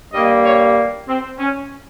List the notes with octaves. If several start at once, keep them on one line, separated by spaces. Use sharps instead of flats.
G2 G3 A#3 D#5
C#5
C4
C#4